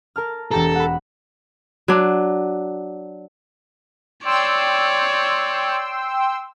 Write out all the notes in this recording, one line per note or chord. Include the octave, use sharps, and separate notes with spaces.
A#4 A5 F6
E1 G4 A4 A#5
F#5 B5
F#3 D4
C#5 D5 G5 C6 E6